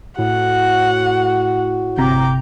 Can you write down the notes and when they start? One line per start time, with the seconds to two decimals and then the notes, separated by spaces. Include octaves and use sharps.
0.19 A2 F#4 F#5
1.98 G1 C3 G5 A#5 D6